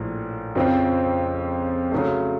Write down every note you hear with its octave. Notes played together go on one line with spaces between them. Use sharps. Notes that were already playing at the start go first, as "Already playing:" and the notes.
Already playing: A#1 A2 F3 A#3
F2 C#3 F3 C4
C#3 F#3 A3